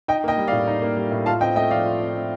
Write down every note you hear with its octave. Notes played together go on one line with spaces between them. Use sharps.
D#4 D#5 G5
A#3 D#5 G5
G3
A2 D5 F5
D#4
A#3
G3
A2
F4 F5 A5
C4 D#5 G5
A3 D#5 G5
F3 D5 F5
F4
C4
A3